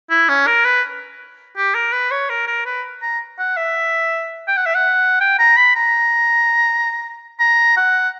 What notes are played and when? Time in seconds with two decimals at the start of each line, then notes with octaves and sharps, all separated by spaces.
0.10 E4
0.29 C#4
0.47 A#4
0.65 B4
1.57 G4
1.75 A#4
1.93 B4
2.11 C#5
2.30 A#4
2.47 A#4
2.66 B4
3.02 A#5
3.39 F#5
3.57 E5
4.48 G5
4.57 F#5
4.66 E5
4.75 F#5
5.21 G5
5.39 A#5
5.57 B5
5.76 A#5
7.40 A#5
7.76 F#5